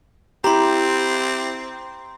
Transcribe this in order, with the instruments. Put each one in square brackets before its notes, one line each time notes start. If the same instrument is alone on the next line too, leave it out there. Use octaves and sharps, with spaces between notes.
[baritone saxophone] C4 [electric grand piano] E4 G4 [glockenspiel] A#5 C6